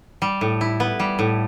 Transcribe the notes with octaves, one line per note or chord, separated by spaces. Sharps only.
G3
A2
E4
B3
G3
A2